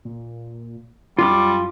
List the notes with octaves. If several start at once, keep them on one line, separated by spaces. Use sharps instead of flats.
A#2
F#2 G3 F4 D6